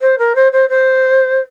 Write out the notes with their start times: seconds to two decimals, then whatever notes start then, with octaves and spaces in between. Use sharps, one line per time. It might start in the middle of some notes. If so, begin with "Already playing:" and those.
0.01 C5
0.18 A#4
0.35 C5
0.52 C5
0.69 C5